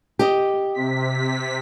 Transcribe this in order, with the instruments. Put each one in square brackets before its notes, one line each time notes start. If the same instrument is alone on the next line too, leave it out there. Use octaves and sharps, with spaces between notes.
[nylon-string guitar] G4 D#5
[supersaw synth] C3 B6